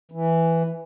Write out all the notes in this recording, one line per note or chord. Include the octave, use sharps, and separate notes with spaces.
E3